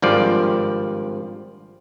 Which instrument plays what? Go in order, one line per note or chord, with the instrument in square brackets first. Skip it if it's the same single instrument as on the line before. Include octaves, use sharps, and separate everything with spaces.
[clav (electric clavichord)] G#1 G2 F3 D5